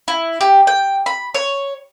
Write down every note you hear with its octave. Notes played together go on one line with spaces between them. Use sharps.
E4
G4
G5
B5
C#5